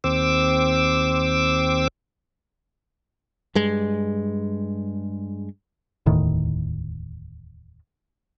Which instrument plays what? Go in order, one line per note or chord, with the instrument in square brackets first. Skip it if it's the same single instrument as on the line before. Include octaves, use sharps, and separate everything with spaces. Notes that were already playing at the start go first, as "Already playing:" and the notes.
[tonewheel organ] D#2 C4 D6 E6
[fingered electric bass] G2 G#3
[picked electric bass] E1 D2 A2 D#3